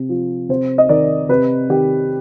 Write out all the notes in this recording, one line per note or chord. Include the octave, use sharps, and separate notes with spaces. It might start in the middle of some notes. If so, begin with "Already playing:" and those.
Already playing: C3
F3
C3 C5
D#5
D#3 D5
C3 B4
D#3 G4